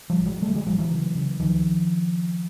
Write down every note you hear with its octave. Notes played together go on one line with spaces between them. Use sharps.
F3 G3
A1
F#3 G#3
D3 G3 A3
F#3 G#3
A1 F3 G3
E3 F#3
C#3
C#3
C#2 D#3 F3